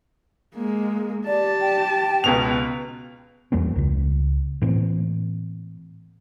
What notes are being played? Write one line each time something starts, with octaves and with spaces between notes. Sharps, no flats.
G#3 A#3
G4 D5 A5
G5
C#2 B2 F7
E2 G3 A#3 C#4
C#2 C#3
A2 E3 A#3 C4